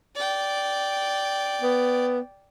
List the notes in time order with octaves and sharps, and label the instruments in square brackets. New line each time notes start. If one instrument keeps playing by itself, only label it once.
[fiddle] D5 G5
[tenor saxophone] B3